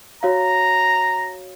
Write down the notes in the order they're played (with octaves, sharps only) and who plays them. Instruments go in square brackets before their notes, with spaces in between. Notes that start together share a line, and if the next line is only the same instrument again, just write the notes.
[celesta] F#4 C#5 F5 [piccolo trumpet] A#5